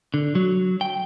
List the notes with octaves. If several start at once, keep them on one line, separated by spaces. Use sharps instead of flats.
D3
F#3
G5